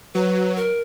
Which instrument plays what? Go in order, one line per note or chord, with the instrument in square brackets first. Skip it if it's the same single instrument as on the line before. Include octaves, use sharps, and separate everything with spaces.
[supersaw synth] F#3 [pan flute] B4
[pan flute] A#4